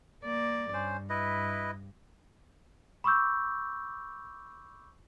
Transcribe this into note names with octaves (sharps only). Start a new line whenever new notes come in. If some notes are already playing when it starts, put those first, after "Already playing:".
A#3 D5
G2 C#4 C5
E4 B4 D#5
B5 C#6 D6 E6 G6